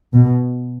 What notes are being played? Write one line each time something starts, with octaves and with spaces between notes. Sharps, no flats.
B2